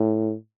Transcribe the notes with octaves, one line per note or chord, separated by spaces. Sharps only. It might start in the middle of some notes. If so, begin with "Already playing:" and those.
Already playing: A2